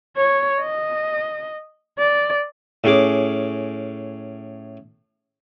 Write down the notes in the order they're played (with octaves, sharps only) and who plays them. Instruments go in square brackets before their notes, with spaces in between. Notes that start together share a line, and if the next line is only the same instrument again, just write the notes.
[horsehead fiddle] C#5
D#5
D5
[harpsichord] A2 C#4 G#4 D6